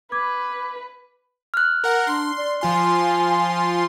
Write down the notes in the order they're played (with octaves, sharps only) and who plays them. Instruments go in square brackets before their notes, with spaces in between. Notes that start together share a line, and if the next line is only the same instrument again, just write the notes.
[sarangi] B4 [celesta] D6 G#6
[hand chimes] F6 F#6
[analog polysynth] A#4 F#5
[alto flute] D4 [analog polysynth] C6
[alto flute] D5
[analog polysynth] F3 F4 C6 [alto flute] G#5